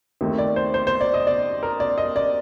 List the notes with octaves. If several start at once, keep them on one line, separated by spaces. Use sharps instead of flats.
D#2 D#3 A3 C4
D5
C5
C5
C5
D5
D#5
D5
A#4
D5
D#5
D5